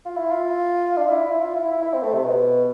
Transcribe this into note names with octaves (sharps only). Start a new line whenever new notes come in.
F4
E4
F4
D4
E4
E4
F4
E4
E4
E4
C4
A3
C3
B2